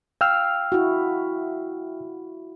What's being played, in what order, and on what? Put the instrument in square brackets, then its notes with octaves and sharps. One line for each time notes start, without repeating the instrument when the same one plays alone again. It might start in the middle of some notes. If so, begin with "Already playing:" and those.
[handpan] F5 [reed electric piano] G5 E6 F6
[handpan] E4 F#4